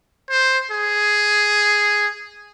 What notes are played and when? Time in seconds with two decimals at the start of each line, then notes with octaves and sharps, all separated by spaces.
0.30 C5
0.71 G#4